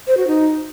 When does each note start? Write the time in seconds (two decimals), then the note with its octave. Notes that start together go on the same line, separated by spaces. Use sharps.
0.07 C5
0.17 F#4
0.27 D#4